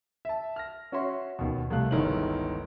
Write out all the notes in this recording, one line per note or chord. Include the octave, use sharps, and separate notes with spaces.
E5 A5
F6 A#6
C#4 F#4 C#5 E5 C6
D#2 B2
C2 G3 A3 F5 F#6
G1 C#2 D#3 E4 C#5 F#7